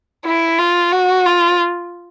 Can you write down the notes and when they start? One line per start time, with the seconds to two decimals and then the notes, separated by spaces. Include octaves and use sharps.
0.25 E4
0.59 F4
0.92 F#4
1.26 F4